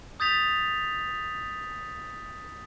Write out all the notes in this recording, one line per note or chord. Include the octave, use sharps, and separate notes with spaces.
D#6 G6 A6 B6 F7